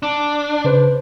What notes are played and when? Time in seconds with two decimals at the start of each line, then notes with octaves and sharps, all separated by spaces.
0.03 D4
0.65 C#3 B4 C5